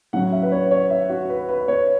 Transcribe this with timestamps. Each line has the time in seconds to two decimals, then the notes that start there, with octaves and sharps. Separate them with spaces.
0.13 A2 F#3 C#4 F#5
0.32 E5
0.43 B4
0.52 C#5
0.71 C#5
0.90 E5
1.09 F#4
1.29 B4
1.49 B4
1.68 C#5